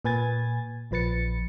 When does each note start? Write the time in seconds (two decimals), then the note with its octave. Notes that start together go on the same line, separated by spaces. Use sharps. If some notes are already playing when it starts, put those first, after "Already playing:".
0.05 A#2 B4 G#5 G#6 A6
0.91 A#1 F3 B4 A6 C#7